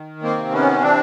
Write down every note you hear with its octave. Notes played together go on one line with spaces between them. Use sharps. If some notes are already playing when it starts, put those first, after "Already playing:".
Already playing: D#3
A#3 C4
C3
B3 C#4
E3 C4 D4